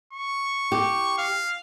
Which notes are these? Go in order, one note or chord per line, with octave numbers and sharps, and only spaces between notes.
C#6
G4
F5